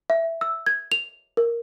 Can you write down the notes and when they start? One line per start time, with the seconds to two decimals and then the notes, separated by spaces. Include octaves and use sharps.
0.10 E5
0.41 E6
0.66 G#6
0.92 F7
1.37 A#4